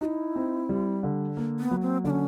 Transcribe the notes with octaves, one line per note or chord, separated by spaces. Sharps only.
D#4 E4 F#4
C4
G3
D3
A#3
B3
F#3
C4
D3 D4
C#4